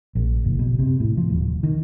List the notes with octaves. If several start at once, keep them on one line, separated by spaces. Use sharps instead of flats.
A#1
F#1
B2
C3
A2
F3
D#1
D#3